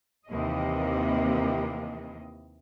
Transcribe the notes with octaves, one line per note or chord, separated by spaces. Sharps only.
D#2 C3 E3 A#3 D#5